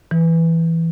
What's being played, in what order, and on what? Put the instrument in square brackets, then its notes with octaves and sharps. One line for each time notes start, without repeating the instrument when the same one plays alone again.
[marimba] E3